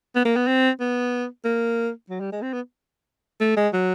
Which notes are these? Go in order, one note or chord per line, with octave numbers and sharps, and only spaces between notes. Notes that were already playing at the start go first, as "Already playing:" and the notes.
B3
A#3
B3
C4
B3
A#3
F#3
G3
G#3
C4
B3
A3
G#3
F#3